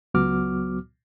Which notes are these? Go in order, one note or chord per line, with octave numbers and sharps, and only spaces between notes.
C#2 F#3 B3 F#4 D6 F6